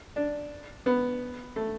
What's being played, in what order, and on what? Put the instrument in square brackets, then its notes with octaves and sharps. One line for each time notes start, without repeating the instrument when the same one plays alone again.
[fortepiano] D4
B3
A3